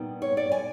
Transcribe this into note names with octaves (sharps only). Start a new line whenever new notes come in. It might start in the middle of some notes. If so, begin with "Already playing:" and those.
Already playing: A#2 G3 B3 D#4
C#5
D5
G#5